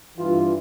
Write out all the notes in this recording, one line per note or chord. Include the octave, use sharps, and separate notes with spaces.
G2 E3 F4